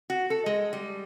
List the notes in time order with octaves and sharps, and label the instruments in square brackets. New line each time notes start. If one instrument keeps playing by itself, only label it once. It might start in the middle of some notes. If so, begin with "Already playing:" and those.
[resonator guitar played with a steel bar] F#4
A4
G#3
G3